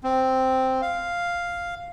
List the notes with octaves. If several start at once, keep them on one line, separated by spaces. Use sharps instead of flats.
C4
F5